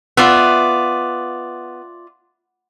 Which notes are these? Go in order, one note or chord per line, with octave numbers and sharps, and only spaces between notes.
B3 F4 D5 E5